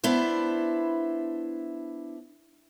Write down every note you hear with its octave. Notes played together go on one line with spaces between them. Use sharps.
B3 D4 E4 C5